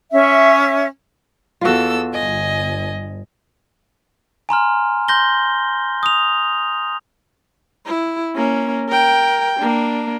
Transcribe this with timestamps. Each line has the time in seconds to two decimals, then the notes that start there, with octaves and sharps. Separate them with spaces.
0.12 C#4 E5
1.61 E2 F4 F#4 A4 E6
2.13 G1 D#5 G#5
4.49 G#5 A#5 C6 F6
5.08 C6 G6 A#6 G7
6.03 D#6 F7
7.86 E4
8.36 A#3 C#4
8.89 A#4 G5
9.60 A#3 D4